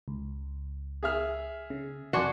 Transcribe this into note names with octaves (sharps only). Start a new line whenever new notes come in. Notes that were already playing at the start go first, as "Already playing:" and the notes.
C#2
G#4 E5 F6
C#3
F2 D4 F#4 G#5 C6